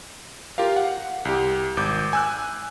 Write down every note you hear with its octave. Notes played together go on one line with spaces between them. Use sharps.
F4 G4 A#4 F5
F#5
C2 G4
G#1 D6 G6
G#5 E6 F#6